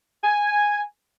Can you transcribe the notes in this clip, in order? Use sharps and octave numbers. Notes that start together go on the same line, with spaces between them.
G#5